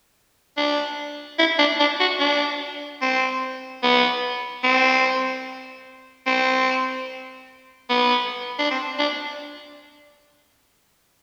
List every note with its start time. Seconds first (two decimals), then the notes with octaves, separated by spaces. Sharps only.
0.57 D4
1.39 E4
1.59 D4
1.80 D4
2.00 F#4
2.20 D4
3.02 C4
3.83 B3
4.64 C4
6.27 C4
7.90 B3
8.59 D4
8.71 C4
8.99 D4